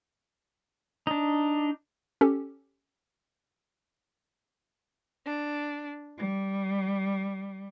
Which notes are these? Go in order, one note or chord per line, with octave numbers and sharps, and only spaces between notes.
D4 D#4
C#4 G4 A4
D4
G3